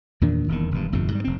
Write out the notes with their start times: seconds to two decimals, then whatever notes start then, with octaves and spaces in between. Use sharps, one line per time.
0.21 E2 A#2 D#3 D4
0.48 D#1 E2 D#3
0.71 E1 G2
0.92 G1 F2 A2 C3
1.12 G#2 G3
1.24 F1 C4